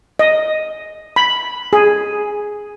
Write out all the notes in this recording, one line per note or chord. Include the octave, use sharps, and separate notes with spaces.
D#5
B5
G#4